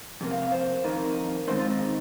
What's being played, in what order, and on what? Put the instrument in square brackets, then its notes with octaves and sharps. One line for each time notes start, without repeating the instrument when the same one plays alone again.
[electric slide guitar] F2 C3 A#3
F5
F5
C5
F2 D#3 A#3 D#4
D#3 G#3 C4 D#4 C5
F4
D#4